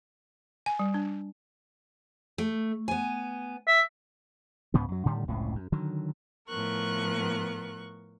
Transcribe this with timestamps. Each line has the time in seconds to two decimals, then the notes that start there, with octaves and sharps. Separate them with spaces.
0.66 G#5
0.79 G3
0.94 D4
2.38 A3
2.88 B3 G#5
3.67 E5
4.74 C#2 G#2 C#3 B3
4.88 F#2 F#3
5.05 A2 D3 D#3 G3
5.28 F#1 C#2 A2 C3
5.55 F#2
5.72 D3 D#3 F#3
6.47 A2 F3 B3 A#4 C#6 F#6